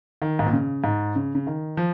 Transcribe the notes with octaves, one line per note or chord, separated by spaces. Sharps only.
D#3
G#2
A#2
C#3
G#2
C#3
C#3
D#3
F3